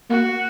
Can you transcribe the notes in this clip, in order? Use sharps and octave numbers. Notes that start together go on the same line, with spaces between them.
A#3 F#4